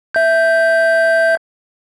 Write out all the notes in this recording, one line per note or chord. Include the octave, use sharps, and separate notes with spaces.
E5 G6